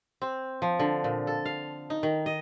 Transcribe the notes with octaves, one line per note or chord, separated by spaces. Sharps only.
C4
F3
D3
A#2
A4
F5
D#4
D#3
D#5